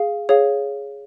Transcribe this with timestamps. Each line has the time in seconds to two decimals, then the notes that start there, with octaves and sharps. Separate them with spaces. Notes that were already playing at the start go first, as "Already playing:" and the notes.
Already playing: G#4 F5
0.29 G#4 C#5 F5